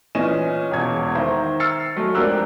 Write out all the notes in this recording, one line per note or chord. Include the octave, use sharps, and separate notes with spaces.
A#2 E3 C#4 D#5 E7
E1 E2 C#5 G#6
D#3 C5 E5 A#5
E6 F6 A6 C7 C#7
F#3 G#3 A3
F2 D4 G4 A#4 E6 F#6